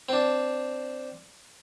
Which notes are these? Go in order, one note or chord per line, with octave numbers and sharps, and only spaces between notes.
C4 D4